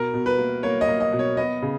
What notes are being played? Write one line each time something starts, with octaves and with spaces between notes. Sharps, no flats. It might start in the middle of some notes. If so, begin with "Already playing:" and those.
Already playing: B2 A#4
B2
B4
A#3
A#3 C#5
D#5
A#3
D#5
B2
C#5
B3 D#5
C#3